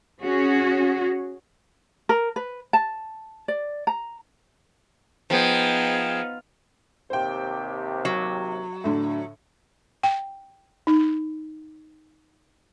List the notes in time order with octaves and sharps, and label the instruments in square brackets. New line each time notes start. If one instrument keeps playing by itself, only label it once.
[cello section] C#4 F#4 G#4
[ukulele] A#4
B4
A5
D5
A#5
[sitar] F3 [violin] B3 D#4 [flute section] G#4 G5
[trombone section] D#2 C3 [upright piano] C5 G5
[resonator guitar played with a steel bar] F#3
[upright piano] A2 D3
[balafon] G5
D#4